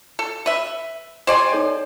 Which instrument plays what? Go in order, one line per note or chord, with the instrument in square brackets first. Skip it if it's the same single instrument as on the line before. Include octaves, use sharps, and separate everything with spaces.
[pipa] A4
B4 E5
[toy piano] G4 D#5 G5 [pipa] C5 D5 G#5
[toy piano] D#4 A4 C#5